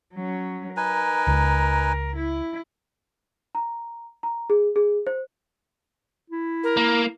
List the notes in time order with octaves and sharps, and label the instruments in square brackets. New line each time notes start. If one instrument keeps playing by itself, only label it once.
[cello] F#3 C#4
[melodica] D#4 B4 G#5 [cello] A#4
[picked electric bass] C#2
[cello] E4
[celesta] A#5
A#5
G#4
G#4
C5
[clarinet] E4
[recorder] A#4
[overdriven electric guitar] A#3